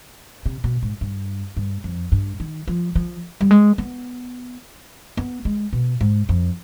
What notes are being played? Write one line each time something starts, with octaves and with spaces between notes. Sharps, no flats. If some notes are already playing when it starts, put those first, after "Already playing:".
C3
B2
G#2
G2
G2
F2
G2
D#3
F3
F3
G3
G#3
B3
B3
G#3
B2
G#2
F2